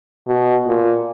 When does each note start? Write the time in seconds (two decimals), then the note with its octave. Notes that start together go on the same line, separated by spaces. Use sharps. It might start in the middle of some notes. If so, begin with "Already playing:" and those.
0.28 B2
0.67 A#2